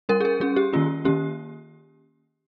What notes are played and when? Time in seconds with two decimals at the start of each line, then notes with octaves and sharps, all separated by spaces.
0.09 G3 C#4 A#4
0.20 G#4
0.25 A#4
0.40 G3 C#4 G#4
0.56 G4
0.73 D#3 A#3 C#4 F4
1.05 D#3 A#3 C#4 G4